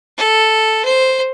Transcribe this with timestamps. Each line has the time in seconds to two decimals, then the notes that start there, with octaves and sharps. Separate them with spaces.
0.17 A4
0.85 C5